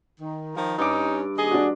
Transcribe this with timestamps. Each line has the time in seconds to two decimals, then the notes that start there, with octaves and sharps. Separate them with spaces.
0.20 D#3
0.56 D#3 F3
0.78 G2 C#4 D#4 D6
1.38 D#2 G#4 D#5
1.51 D4 F#4